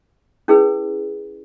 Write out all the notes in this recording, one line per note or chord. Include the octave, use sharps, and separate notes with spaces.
C#4 E4 G#4 B4